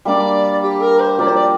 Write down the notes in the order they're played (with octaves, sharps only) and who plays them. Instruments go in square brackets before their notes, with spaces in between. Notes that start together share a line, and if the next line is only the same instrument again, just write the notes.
[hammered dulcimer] G3 A#3 D4 [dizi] D5
[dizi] G4
A#4
C5
[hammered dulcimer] F3 A#3 G4 A#4 [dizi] D5
[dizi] C5
D5